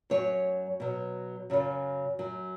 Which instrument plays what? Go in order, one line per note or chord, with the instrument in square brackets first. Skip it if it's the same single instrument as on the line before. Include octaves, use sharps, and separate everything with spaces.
[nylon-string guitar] F#2 F#3 C#5
B2 F#3
F#2 C#3 F#3
F#2 F#3